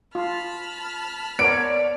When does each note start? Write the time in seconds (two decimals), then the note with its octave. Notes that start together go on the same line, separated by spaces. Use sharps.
0.15 F4 A5 B5 F6
1.39 B3 A#4 C#5 D5 D7